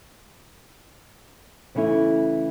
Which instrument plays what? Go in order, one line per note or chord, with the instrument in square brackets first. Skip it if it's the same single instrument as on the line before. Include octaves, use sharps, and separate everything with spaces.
[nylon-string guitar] C#3 E3 A3 C#4 E4